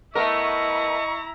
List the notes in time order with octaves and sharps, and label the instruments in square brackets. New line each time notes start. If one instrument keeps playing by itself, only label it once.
[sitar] A3 B3 A#4 [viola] E4 A#5 [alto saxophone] D#5 [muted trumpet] C#6